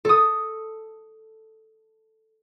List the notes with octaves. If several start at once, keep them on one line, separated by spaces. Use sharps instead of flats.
A4 D#6